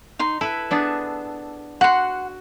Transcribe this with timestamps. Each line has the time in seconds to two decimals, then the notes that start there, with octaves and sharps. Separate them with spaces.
0.19 D#4 C6
0.41 E4 A4 B4
0.71 B3 D4 G#4
1.81 F#4 F#5 C6